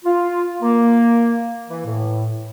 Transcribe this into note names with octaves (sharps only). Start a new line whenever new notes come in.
F4
A#3
E3
A2